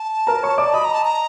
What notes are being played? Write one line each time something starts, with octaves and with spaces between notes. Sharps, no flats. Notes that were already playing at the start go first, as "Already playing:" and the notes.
Already playing: A5
A#4 A#5
C#5 C#6
D5 D6
D#5 B5 D#6
A#5
A5
A#5